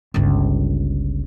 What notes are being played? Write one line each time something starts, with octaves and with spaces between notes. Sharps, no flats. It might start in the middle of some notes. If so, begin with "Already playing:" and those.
G1 C#2